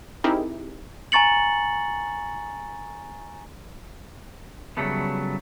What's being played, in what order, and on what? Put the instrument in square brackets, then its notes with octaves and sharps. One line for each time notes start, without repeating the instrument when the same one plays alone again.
[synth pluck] C4 D#4 E4 G4 G#4 A#4
[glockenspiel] G#5 A#5 C#6 A6 C#7 F#7
[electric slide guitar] C#3 F#3 G3 A3 B3